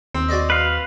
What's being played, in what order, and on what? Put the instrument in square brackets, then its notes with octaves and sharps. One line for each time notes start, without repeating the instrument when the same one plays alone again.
[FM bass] D#2 [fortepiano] C4
[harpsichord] F#4 D5 D#5
[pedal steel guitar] B4 F5